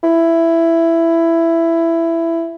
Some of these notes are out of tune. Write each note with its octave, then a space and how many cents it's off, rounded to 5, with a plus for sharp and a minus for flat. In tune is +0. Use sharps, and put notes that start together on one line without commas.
E4 +10